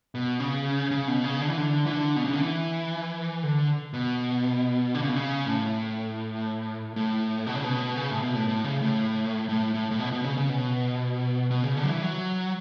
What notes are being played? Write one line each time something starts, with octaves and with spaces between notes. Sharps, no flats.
B2
C#3
C#3
B2
C#3
D3
E3
D3
E3
D3
B2
C#3
D3
E3
D3
B2
D3
C#3
B2
C#3
A2
A2
B2
C#3
B2
C#3
A2
B2
A2
A2
C#3
A2
A2
A2
A2
B2
B2
C#3
C#3
B2
B2
C#3
D3
F#3
E3
F#3